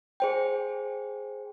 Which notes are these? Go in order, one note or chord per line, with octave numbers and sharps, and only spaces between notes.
G#4 C5 G5